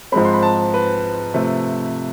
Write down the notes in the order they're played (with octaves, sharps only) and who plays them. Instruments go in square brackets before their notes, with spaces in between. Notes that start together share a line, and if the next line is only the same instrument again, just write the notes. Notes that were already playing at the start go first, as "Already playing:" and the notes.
[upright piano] G#2 F3 G#3 C4 B5
C6
B5
A5
B4
C3 F3 A3